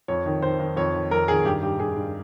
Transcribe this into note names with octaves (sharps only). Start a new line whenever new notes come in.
F2 C#5
D#3
D#3 C5
D#3
F2 C#5
D#3
F2 A#4
D#3 G#4
G2 G4
G2 G4
G2 G#4
G2